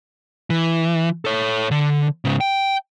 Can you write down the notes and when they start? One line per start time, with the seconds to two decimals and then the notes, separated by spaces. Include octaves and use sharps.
0.50 E3
1.25 A4 C#5
1.71 D3
2.25 G#2 C#3
2.41 G5